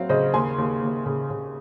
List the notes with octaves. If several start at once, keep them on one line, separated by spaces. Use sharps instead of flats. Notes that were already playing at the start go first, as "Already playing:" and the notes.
Already playing: F#3 C4 F5
C#3 C5 D#5
D#2 G#5 C6
D#2
D#2
C#3
C#3